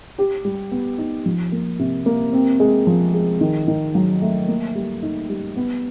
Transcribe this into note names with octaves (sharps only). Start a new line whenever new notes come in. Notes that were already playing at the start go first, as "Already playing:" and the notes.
G4
G3
B3
D#4
F3
A#3
C3
A#3
C4
G#3
F3
G#3
D#3
D#3
F#3
A3
A#3
G3
D#4
G3
B3